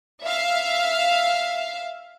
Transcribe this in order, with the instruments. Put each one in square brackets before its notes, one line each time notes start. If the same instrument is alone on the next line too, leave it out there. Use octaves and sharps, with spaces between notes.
[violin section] E5 F5